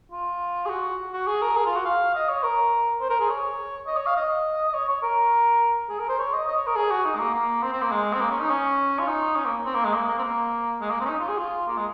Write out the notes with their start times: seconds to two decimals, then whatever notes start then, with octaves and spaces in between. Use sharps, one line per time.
0.12 F4
0.66 G#4
0.70 F#4
1.13 F#4
1.27 G#4
1.42 A#4
1.56 G#4
1.66 F4
1.76 F#4
1.85 F5
2.15 D#5
2.29 C#5
2.44 A#4
3.01 C5
3.10 A#4
3.20 G#4
3.29 C#5
3.87 D#5
3.97 C#5
4.06 F5
4.16 D#5
4.69 D#5
4.74 C#5
4.89 C#5
5.03 A#4
5.89 G#4
5.99 A#4
6.09 C5
6.19 C#5
6.33 D#5
6.48 D#5
6.57 C#5
6.67 A#4
6.76 G#4
6.91 F#4
7.05 D#4
7.15 G#3
7.19 A#3
7.34 A#3
7.63 C4
7.73 C4
7.82 A#3
7.91 G#3
8.13 C4
8.21 A#3
8.30 C#4
8.41 D#4
8.50 C#4
8.99 F4
9.07 D#4
9.36 C#4
9.45 A#3
9.65 C4
9.75 A#3
9.84 G#3
9.94 A#3
10.08 A#3
10.19 C4
10.23 A#3
10.81 G#3
10.90 A#3
11.00 C4
11.05 C#4
11.09 D#4
11.19 F4
11.29 G#4
11.38 F4
11.67 A#3
11.77 G#3